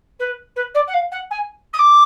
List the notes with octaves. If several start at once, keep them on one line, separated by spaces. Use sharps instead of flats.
B4
B4
D5
F#5
F5
F#5
G#5
D#6
D6